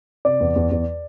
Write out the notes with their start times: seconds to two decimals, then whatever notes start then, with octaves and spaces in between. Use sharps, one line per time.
0.25 C3 D5
0.40 E2
0.56 E2
0.71 E2